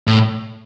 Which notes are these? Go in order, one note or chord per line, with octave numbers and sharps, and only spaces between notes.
A2